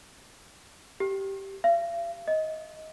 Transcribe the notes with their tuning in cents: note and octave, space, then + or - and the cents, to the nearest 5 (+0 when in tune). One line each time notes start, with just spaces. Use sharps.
G4 -10
F5 -45
D#5 +20